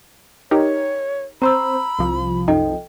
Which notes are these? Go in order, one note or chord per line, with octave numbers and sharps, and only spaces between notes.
D#4 G4 A#4 C#5
C4 C5 A#5 B5 E6
C2 F3
F#2 D#4 A4 D#5 G5